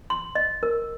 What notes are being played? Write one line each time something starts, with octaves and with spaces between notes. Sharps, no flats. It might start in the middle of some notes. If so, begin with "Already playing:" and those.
C6
D#5
A#4